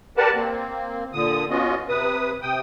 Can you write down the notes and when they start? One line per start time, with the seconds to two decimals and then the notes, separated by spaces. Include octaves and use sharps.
0.17 G4 A#4 B4 D5 F#5 A5
0.35 A#3 C4
1.13 A#2 D3 D#6
1.50 B3 C#4 F4 F#4 D#5
1.89 C3 B4 D#6
2.42 C3 G5 D#6